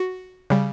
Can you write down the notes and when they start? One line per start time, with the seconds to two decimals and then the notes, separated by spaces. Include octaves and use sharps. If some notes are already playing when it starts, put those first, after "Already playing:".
Already playing: F#4
0.50 C#3 G3